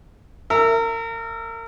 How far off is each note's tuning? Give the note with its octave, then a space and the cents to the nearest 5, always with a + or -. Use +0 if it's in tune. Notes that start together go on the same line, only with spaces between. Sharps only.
A#4 -30 E5 +5